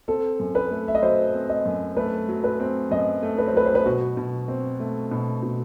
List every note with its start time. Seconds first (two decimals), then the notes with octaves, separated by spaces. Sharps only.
0.08 C4 A4
0.40 F#2
0.55 B4
0.71 A3
0.88 E5
0.95 D#5
1.02 F#3 C5
1.34 C4
1.49 D#5
1.66 F#2
1.97 A3 B4
2.28 F#3
2.44 B4
2.60 C4
2.91 F#2 D#5
3.22 A3
3.38 B4
3.47 C5
3.53 F#3 B4
3.66 C5
3.75 B4
3.86 B2 F#4
4.17 B2
4.48 C4
4.80 A3
5.11 B2
5.43 B2